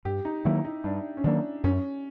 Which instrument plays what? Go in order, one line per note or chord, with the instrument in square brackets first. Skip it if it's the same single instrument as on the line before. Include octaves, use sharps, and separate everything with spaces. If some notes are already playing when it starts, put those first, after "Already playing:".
[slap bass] G2 [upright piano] G4
[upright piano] D#4
[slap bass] D#3 F#3 A#3 [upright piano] E4
[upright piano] D#4
[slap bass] G2 [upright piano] D4
[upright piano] C#4
[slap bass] D#3 F#3 A#3 [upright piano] D4
[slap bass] F#2 [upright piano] C#4